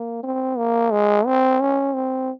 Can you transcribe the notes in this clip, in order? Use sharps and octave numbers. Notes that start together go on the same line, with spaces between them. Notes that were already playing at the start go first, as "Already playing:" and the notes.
Already playing: A#3
C4
A#3
G#3
C4
C#4
C4